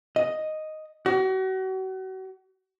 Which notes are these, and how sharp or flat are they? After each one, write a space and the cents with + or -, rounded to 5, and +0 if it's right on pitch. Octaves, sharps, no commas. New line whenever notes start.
D#5 +0
F#4 +35